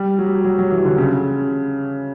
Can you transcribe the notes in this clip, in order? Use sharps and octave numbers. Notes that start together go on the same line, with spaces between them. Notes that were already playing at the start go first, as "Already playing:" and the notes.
Already playing: G3
F#3
F#3
F#3
E3
D3
C#3